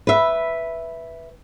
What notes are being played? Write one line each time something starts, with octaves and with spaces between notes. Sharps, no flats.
B4 E5